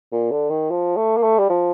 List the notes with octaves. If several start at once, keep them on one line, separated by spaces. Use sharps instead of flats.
A#2
D3
D#3
F3
A3
A#3
A3
G3
F3